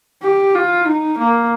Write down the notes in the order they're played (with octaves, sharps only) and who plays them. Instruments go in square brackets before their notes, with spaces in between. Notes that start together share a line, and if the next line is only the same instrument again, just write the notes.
[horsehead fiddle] G4
F4
D#4
A#3